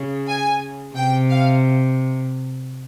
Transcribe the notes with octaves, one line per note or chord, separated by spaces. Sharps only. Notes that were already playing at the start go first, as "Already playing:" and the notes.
Already playing: C#3
G#5
C3 G5
F5